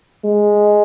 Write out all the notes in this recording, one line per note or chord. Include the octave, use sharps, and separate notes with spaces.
G#3